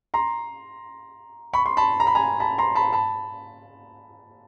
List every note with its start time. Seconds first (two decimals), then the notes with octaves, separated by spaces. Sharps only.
0.14 A#5 C6
1.53 B5 C#6
1.66 C6
1.77 A5 B5
2.00 A#5
2.07 B5
2.15 G#5 A#5
2.40 A5 B5
2.58 A#5 C6
2.75 A5 B5
2.93 A5 B5